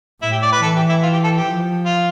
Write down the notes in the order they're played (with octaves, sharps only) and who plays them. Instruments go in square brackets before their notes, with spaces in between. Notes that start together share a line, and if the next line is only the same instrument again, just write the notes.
[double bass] A2 [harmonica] E4
[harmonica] G4
D5
B4
[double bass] E3 [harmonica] A4
[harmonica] G4
E4
F4
G4
A4
G4
[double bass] F3
[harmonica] F4